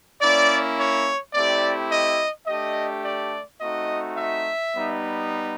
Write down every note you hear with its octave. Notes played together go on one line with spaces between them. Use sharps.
A#3 C#4 E4 D5
C#5
A3 C4 E4 G4 D5
D#5
A3 D4 G4 D#5
D5
A3 C4 D#4 F#4 D#5
E5
G3 B3 D#4